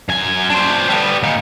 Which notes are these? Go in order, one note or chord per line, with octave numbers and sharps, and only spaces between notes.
F#2 G#5
D4 C5
G3 B3
A#2 D#4